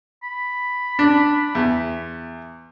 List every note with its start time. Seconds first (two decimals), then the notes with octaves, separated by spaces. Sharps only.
0.23 B5
0.99 D4
1.55 E2